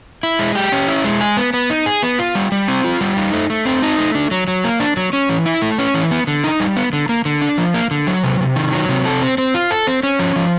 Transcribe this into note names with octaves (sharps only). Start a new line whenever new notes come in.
E4
G#3
G4
C#4
E4
G#3
G#4
B3
B3
D#4
G#4
B3
F4
G3
G3
C4
F4
G3
D#4
A3
A3
C4
D#4
A3
D4
F#3
F#3
A#3
D4
F#3
C#4
E3
E4
A3
C#4
E3
B3
D3
D#4
G3
B3
D3
A#3
D3
D4
F3
A#3
D3
F#3
C3
C3
D#3
F#3
C3
A4
C4
C4
F4
A4
C4
C#4
F3
F3